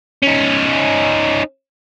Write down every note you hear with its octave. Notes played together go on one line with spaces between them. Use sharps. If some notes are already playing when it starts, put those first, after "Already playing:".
C#4 D#4